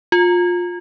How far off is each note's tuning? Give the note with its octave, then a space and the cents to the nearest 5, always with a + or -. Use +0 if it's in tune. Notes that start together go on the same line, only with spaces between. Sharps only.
F4 +20